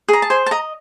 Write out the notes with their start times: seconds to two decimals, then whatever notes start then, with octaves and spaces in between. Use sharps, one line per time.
0.08 G#4 A#5
0.22 A5
0.30 C5 G#5
0.46 A5
0.51 D#5 A#5